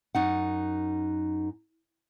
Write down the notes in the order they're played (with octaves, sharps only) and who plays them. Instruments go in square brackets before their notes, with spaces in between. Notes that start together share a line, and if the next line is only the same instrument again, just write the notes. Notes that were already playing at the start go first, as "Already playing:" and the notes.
[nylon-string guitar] F#2 D#4 F#5